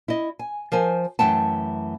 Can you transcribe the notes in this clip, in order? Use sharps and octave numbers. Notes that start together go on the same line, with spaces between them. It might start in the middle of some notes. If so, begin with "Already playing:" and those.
E4 D#5
G#5
F3 A#4 C5 G#5
F#2 E3 A3 F#5 G5 A5